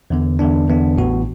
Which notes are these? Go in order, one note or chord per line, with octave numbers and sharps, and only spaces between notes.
E2 D3 B3
E2 D3 B3 D4
E2 D3 B3 D4
A1 A2 E3 B3 F#4